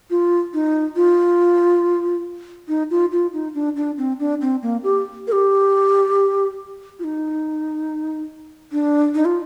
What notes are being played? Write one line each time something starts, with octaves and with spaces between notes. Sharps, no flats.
F4
D#4
F4
D#4
F4
F4
D#4
D4
D4
C4
D4
C4
A#3
G4
A#4
G4
F4
D#4
D4
D#4
F4